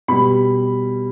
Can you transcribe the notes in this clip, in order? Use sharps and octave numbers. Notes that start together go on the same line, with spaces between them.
B2 G3 B5